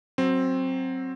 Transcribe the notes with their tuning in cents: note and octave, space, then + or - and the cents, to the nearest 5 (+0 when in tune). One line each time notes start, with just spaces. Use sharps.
F#3 +0 C4 +10